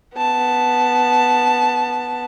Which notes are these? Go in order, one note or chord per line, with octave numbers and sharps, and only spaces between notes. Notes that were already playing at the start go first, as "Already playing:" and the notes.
B3 A5